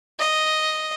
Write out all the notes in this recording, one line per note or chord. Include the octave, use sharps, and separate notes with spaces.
D#5